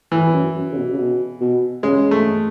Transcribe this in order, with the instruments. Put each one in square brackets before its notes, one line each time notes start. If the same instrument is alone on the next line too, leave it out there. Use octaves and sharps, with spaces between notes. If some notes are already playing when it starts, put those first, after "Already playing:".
[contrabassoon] A2 [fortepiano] E3
[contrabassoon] E2
F#2
F#2
C#3
B2
C#3
B2
B2
[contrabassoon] C#3 [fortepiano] G#3
[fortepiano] A3